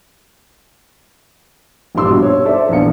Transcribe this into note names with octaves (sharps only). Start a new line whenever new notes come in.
A#1 G2 G3 D4 C6 E6
B2 D4 F#4
C#5
A4 C5 D5 E5
A#1 E2 F4 C#7